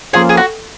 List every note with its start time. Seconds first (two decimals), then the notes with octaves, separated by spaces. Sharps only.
0.13 F3 A#3 C#4 F4 G#4 C5
0.29 G#4
0.37 F#4